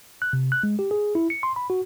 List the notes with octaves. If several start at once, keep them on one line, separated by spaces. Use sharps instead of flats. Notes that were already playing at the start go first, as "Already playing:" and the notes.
F#6
C3
F#6
G#3
G4
G#4
E4
C#7
C6
B5
F#4